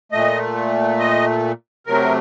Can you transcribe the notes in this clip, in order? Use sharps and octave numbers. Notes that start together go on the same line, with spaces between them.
A#2 A3 D#5
D#5
C3 F#3 A3 A#4